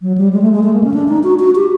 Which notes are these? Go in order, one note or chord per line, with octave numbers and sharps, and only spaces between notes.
F#3
G3
G#3
A3
G#3
A3
A#3
C#4
D4
D#4
F#4
F#4
G4